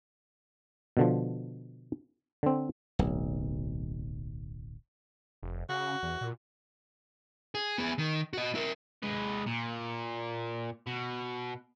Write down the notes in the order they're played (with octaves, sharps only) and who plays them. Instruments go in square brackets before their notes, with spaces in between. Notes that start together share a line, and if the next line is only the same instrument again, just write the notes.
[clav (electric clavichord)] B2 D3 F3
D3 C4
[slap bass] D1 B1
[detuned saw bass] F1
[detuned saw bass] C#3 [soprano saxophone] F#4
[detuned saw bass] E2
A#2
[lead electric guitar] G#4
B3 G#4
D#3
F#4 D#5
E4 A#4
[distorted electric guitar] G#3 B4
A#2
B2